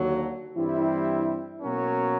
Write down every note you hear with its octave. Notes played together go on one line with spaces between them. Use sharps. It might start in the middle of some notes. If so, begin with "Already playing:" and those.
Already playing: D#2 D3 F#3
G2 E3 G3 C4 E4
B2 F#3 A#3 C#4